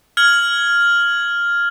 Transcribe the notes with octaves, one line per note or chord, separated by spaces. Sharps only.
F6 G#6 F#7